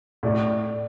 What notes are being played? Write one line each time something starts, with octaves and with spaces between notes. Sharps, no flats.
A2 D5